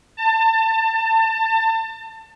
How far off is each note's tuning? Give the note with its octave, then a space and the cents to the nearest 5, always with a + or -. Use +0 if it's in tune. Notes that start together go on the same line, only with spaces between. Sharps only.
A5 +30